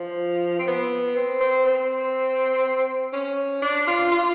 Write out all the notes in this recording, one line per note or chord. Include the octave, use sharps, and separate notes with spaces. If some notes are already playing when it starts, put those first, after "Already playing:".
Already playing: F3
C4
B3
C4
C4
C4
C#4
D4
F4
F4